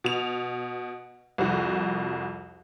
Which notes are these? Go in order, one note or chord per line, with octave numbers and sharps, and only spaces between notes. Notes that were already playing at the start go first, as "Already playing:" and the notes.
B2 F7
C2 F2 F#4